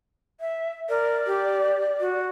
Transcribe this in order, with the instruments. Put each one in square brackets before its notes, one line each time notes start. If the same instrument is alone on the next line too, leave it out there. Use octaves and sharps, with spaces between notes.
[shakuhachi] E5
[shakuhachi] A#4 [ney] D5
[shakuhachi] G4
F#4